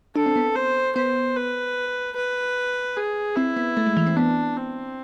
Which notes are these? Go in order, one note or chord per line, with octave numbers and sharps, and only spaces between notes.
D4 A4
C4
B3
C5
B3 C5
B4
B4
G#4
C4 E4
B3
A3
G#3
E3
C4
B3 D4
C4